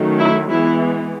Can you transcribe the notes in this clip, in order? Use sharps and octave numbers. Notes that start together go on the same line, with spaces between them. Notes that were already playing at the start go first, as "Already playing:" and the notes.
Already playing: D#3 F#3 A3 C#4
E4
E3 G#3 B3 E4